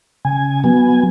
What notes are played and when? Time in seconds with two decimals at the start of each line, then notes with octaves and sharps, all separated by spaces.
0.25 C#3 G#5
0.64 F#3 B3 G#5